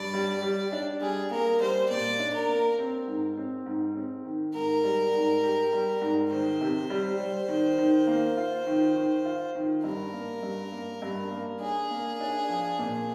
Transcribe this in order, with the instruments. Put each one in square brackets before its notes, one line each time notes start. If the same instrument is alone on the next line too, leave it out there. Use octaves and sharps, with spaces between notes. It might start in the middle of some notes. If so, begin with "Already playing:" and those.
Already playing: [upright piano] G2 [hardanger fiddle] D5
[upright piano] G3
G3
D4
[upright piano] G3 [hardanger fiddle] G#4
[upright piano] A#3 [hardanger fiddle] A#4
[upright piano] G3 [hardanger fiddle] C5
[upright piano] A#2 [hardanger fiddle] D5
[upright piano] D4
[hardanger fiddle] A#4
[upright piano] A#3
C4
G#2
C4
G#2
C4
D#3
[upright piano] G#2 [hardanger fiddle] A#4
[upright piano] G3
G#2
G4
G3
G#2
[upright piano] D#3 [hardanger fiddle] C5
[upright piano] C3
G3
G3
D#3
D#3
A#3
F4
D#3
D#3
F4
D#3
[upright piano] G2 [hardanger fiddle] A#4
[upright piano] A#3
G2
A#3
G2
A#3
[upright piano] D4 [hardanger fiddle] G#4
[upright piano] A#3
D4
F3
A#2